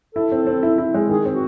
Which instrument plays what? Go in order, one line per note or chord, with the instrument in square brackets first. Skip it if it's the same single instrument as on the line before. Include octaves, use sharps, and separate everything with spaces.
[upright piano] E4 [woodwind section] A4
[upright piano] C4
C4
E4
E4
G#3
[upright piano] D#3 [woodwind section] G#4
[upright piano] C4
[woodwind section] F#4